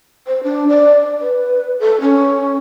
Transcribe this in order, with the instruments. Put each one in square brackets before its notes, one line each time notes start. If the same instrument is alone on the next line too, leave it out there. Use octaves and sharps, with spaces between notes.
[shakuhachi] C5
D4
D5
B4
A4
C#4